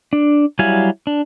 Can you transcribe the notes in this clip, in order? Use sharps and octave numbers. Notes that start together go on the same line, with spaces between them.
D4
F#3 G3 E4 F5 G#5
D4